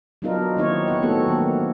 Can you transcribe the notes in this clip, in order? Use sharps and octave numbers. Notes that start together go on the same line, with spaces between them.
F#3 B3 D4 D#4 F4 A#4
D#3 A#3 C4 D#4 E4 C#5
E3 B3 F#5
E3 A3 B3 C4 F#4 A4
D#3 F#3 A#3 B3